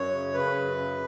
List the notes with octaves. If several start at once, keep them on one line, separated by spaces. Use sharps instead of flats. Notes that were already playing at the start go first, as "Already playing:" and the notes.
Already playing: F#2 C#5
C#3
C#3 B4
F#2
C#3